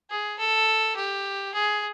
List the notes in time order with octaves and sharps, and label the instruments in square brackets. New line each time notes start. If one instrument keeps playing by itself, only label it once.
[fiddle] G#4
A4
G4
G#4